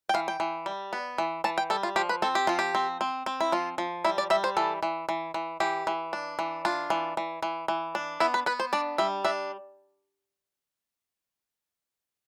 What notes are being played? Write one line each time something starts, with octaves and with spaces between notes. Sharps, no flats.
G5
E3 F5
G5
E3
G3
B3
E3
E3 A5
G5
G3 A4
F4
F3 G4
B4
C4 A4
G4
F3 F4
G4
C4
C4
C4
E4
F3 F4
F3
G3 E4
D5
G3 E5
C5
E3 A4
E3
E3
E3
E3 G4
E3
D4
E3
D4 F4
E3
E3
E3
E3
D4
B3 E4
B4
B3 B4
C5
D4 D5
G3 E5
D4 E5